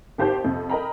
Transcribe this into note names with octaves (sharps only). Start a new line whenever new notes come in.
G#1 D#3 G4 C5 A5 G6
F2 C3
A#4 D#5 G5 A#5 B5